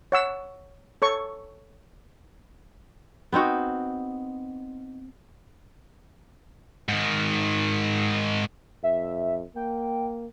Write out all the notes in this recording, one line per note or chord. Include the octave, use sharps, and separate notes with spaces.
C#5 F#5 E6
A4 C#5 C#6
B3 C4 D#4 F#4
G#2 D#3
F2 E5
A#3 G5